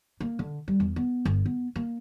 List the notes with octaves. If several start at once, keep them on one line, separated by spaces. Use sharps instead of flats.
A#3
D3
G3
E2
B3
G1
B3
A#3